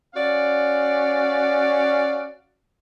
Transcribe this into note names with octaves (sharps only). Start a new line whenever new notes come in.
C#4 F#4 D5 F5